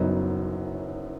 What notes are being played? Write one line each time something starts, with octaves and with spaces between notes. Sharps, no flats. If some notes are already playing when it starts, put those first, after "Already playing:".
Already playing: F#1 F#2 F#3 B3 D#4